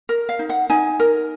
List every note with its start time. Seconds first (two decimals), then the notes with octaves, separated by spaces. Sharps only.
0.09 A#4
0.29 F5
0.39 D#4
0.49 F#5
0.70 D#4 G#5
1.00 A#4